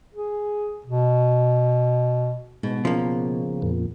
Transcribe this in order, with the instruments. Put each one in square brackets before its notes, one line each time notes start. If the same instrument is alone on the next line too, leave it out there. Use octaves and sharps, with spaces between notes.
[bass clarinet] G#4
B2
[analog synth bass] G#2 [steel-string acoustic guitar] B2
[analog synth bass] C#3 [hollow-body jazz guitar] F3 A#3
[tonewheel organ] F2 A#2